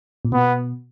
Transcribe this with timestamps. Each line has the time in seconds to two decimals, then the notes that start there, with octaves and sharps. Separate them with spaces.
0.25 A#2
0.32 B2 B3